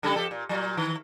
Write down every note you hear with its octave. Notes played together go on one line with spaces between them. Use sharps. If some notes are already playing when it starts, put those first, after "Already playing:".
C#3 G3 A4
F2 G4 A4
A#2
A#2 F#3
D#3